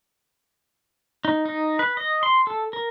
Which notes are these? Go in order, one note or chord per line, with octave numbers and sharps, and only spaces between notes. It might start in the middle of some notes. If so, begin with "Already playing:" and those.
D#4
D#4
B4
D#5
C6
A4
A#4